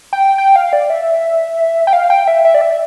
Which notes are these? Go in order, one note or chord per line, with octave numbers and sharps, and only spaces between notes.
G5
G5
F5
D5
E5
G5
F5
G5
E5
E5
D5
E5